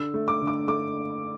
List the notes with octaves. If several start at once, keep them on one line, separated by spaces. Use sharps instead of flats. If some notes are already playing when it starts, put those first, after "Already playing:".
Already playing: D3 E6
A3
D6
D3
D6
A3 D6